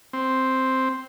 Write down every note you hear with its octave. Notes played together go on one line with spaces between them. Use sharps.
C4